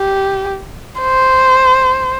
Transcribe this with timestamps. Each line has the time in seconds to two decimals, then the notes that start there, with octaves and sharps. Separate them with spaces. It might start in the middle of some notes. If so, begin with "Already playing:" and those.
Already playing: G4
1.00 C5